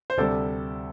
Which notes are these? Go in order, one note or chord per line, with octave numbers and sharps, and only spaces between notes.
C5
D2 C3 G3 A4 D5